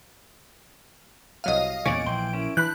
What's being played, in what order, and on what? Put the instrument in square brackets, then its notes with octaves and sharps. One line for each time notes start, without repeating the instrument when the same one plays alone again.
[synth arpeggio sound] C2 F#3 D#7 [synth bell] D#5 F5
[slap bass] E2 A#2 C#3 [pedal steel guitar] C#5 D5 [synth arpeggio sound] G#5 [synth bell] D7
[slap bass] A#1 [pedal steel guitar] E3 G5 C6
[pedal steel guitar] C#4 E4 A#4
[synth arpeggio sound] E3 [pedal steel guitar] D4 B5 G6 [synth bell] F#6